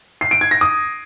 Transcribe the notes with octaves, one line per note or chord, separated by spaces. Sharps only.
C7
D7
G#6
A#6
D#6